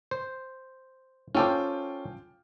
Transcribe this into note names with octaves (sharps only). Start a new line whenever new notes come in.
C5
C#4 F4 A4 C5 G5 D6